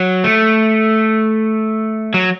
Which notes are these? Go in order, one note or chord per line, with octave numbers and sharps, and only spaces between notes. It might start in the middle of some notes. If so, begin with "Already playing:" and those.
Already playing: F#3
A3
F#3